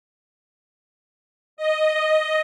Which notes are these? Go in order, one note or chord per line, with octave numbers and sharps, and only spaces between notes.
D#5